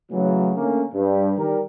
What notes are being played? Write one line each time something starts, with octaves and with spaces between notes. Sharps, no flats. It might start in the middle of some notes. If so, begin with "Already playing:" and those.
A2 C#3 E3 F#3
D3 A3 A#3 C#4
G2
D#3 G3 G4 A#4